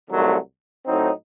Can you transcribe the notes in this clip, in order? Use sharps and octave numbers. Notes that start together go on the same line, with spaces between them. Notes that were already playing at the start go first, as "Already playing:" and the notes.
C2 C3 D#3 F#3 A3
A2 F#3 C4 D#4